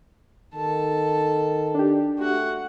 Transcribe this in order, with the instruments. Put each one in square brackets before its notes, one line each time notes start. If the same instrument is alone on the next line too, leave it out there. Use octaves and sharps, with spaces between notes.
[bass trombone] D#3 [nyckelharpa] A4 A5
[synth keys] D4 G4
[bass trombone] A3 [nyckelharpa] F#4 F#5